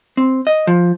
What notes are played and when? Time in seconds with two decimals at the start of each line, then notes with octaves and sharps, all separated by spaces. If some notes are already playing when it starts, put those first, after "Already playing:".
0.17 C4
0.47 D#5
0.67 F3